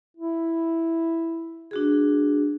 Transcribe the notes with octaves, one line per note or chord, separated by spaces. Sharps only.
E4
D4 F#4 G#4